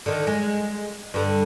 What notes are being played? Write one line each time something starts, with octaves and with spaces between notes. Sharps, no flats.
D3 D#3
G#3
G2 D3